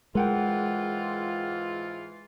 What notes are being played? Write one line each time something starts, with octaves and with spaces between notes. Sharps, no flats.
G#2 E3 G#3 F4 A#4 F#5 G5